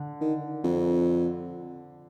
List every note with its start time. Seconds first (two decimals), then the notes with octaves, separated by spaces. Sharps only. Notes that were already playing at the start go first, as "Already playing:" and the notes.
Already playing: D3
0.21 D#3
0.64 F2